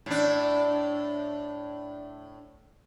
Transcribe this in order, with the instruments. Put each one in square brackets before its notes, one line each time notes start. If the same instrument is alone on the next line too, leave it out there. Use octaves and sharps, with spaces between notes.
[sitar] A2 D4